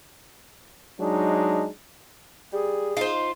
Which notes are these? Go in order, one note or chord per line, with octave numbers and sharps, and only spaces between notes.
F#3 G#3 D4 D#4
G3 G#4
D#4 F4 C5